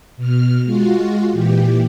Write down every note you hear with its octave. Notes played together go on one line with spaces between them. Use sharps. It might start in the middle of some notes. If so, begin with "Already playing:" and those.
B2 F6
G#3 F4 F#4
A#2 E3 G4